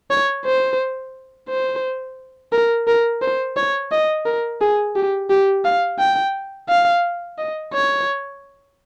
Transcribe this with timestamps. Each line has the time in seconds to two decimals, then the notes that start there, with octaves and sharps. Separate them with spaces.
0.11 C#5
0.45 C5
1.49 C5
2.53 A#4
2.87 A#4
3.22 C5
3.57 C#5
3.92 D#5
4.26 A#4
4.61 G#4
4.96 G4
5.30 G4
5.65 F5
5.99 G5
6.69 F5
7.38 D#5
7.73 C#5